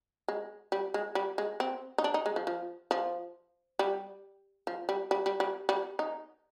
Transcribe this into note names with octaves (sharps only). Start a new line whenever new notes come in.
G#3
G3
G#3
G3
G#3
C4
D#4
D4
D#4
G#3
F3
F3
F3
G3
F3
G3
G3
G3
G3
G3
D#4